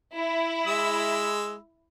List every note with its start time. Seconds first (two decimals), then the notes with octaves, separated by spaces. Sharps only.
0.15 E4
0.67 G#3 E6